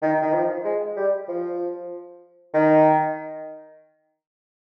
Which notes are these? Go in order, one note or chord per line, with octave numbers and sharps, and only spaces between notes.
D#3
D#3
F3
G#3
G3
F3
D#3